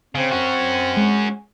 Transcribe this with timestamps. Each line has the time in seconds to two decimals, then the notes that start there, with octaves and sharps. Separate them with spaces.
0.15 C#3 C4
0.32 C#4 F#4
0.97 G#3